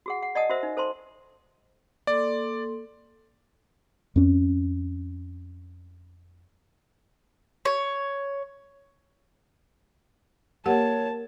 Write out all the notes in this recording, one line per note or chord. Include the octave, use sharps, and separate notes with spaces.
F#4 G#4 F#5
F#5
D5 D#5 F#5 G#5 A5 D#6
F#4 A#4 C5 E5
D#4
A4 C5 A5 C6
A#3 A4 D5 C6
F2 C#4
C#5
A#3 G4 C#5 F#5 A5